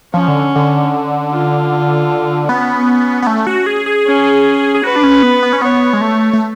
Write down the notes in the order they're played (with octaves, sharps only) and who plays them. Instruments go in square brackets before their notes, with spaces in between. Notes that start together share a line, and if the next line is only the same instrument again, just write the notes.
[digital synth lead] F3 [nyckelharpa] C#4
[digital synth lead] D3
D3
[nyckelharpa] F4
[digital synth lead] B3 [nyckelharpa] C#4
[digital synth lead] B3
A3
F#4
G#4
G#4
[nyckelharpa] C#4
[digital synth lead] G#4
[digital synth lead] F#4 [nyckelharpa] B4
[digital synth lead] D4
C#4
B3
B3
C#4
[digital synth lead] B3 [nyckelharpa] C#5
[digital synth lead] G#3
A3
A3